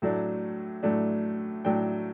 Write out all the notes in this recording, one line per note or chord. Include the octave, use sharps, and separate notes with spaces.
A2 F#3 A3 D4
A2 F#3 A3 D4
A2 F#3 A3 D4 G5